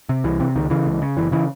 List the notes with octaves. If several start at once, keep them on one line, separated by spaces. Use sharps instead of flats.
C3
C2 E3
C3
C#2 D#3
C#3 E3
C#2
C#3
F#1 E3
C#3 E3